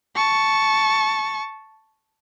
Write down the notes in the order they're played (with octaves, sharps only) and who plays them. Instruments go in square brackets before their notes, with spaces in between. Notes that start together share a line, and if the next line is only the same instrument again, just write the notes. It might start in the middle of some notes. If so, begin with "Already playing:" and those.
[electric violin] A5 C#6